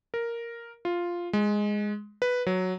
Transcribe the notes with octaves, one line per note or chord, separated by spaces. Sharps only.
A#4
F4
G#3
B4
F#3